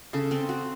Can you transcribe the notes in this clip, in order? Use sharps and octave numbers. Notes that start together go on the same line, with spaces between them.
C#3 A4
C4
F#4